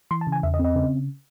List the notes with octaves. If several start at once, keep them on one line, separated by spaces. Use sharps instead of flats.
E3 C6
A5
C#3
G#5
E2 E5
D#5
C4
D#5
C#3